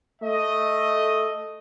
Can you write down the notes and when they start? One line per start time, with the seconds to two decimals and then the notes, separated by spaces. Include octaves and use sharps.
0.22 A3 D#5